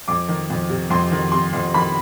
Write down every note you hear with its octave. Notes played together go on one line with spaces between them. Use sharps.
F2 D6
D#3
F2
C3
F2 C6
D#3
C3 C6
F2
D#3 B5